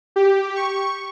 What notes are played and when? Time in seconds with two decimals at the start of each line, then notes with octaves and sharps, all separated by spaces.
0.16 G4
0.56 C#6